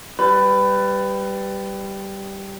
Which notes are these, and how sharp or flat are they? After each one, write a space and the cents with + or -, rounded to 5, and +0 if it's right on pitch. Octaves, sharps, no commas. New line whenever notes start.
G3 +0 B4 +20